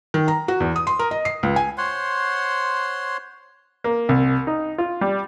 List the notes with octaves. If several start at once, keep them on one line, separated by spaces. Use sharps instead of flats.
D#3
A#5
F#4
E2
D#6
C6
A#4
D#5
C7
C#2
G#5
C5 C#5 F#5 C6
A#3
C2
D#4
F4
G3